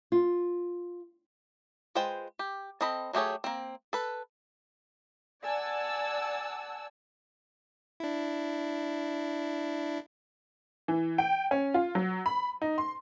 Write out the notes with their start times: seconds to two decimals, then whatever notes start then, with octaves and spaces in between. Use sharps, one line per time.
0.12 F4
1.95 G#3 F4 B4 C5 G5
2.39 G4
2.81 C4 A4 D#5 B5
3.13 F#3 A3 G4 G#4 C#5
3.44 A#3 C4
3.93 A4 B4
5.43 D5 F#5 G#5 A5 E6
8.00 D4 E4
10.88 E3
11.18 G5
11.51 C#4
11.74 F4
11.95 F#3
12.26 B5
12.62 D#4
12.78 C6